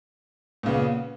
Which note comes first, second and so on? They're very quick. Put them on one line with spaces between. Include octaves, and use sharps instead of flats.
A#2 C#3 B3